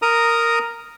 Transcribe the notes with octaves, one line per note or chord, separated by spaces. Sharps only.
A#4 A#5 D#6